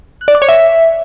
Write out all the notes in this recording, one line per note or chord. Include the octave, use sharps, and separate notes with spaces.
F#6
D5
D6
C#5
E5